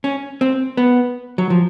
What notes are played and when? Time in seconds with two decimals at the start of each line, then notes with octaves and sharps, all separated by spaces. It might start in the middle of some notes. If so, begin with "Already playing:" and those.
0.04 C#4
0.41 C4
0.77 B3
1.38 F#3
1.50 F3